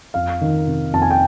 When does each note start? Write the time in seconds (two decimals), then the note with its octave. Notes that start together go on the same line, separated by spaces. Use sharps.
0.14 F2 F5
0.41 D#3
0.67 C3
0.93 F2 A5
1.02 G#5
1.10 G5